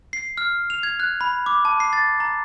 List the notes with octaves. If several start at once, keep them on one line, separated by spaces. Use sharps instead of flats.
C7
F6
F7
G#6
F#6
B5
D6
A5
C7
A6
A#5